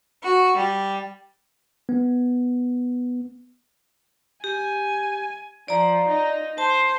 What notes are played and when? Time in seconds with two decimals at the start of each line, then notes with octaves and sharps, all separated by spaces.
0.23 F#4
0.56 G3
1.89 B3
4.44 G4 G#5
5.68 F3 D5 A#5
6.08 D#4
6.58 C5 A5